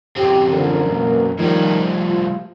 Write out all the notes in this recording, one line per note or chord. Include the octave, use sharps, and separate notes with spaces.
F#2 C4 G4
G#2 D3 F3 A#4
B2 A#3
A2 D#3 F3 G3
F4